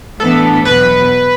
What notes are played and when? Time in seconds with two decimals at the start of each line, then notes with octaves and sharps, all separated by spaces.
0.20 A2 E3 B3 D4 A4
0.65 E2 B2 F#3 B4